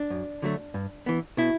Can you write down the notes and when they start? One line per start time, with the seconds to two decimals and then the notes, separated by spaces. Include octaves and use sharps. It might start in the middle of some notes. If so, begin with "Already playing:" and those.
Already playing: D4
0.10 F#2
0.42 D3 F#3 A3
0.74 G2
1.06 E3 B3
1.37 B2 E4